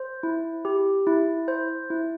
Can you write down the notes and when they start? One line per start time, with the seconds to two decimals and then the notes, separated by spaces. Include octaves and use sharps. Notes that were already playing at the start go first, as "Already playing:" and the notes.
Already playing: C5
0.23 E4
0.65 G4
1.07 E4
1.48 C5
1.90 E4